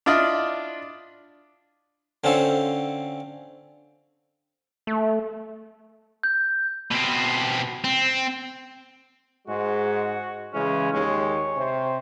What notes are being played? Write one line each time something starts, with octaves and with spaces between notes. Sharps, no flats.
D4 E4 F4 D5 D#5
D3 C4 C#4 F4 A4 C5
A3
G6
B2 C4
C4
G#2 G#3 F#4
C#3 E3 G#3 C#4
D#2 G#3 C#5
C3 C5